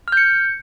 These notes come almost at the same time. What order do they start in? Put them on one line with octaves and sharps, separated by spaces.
F6 G6 C#7